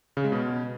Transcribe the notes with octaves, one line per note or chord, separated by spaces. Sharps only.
C#3
G#3
B2